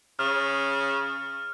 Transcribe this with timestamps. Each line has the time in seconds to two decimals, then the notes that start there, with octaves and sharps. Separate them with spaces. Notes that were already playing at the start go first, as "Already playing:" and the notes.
0.19 C#3 F6